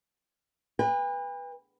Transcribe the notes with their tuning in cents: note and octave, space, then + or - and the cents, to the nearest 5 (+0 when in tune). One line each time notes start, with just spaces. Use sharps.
B4 -10 G5 +45